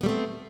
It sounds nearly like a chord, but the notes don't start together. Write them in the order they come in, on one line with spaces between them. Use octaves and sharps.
B3 G3 A3 C4